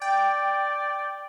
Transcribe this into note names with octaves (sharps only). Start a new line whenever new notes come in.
D5 G5